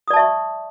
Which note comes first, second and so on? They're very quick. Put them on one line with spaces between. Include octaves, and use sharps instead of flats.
D#6 D5 A5 E5 C#6